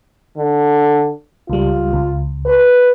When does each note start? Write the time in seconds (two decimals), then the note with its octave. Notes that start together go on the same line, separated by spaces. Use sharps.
0.37 D3
1.50 C#2 G3 F4
1.93 C#2
2.46 B4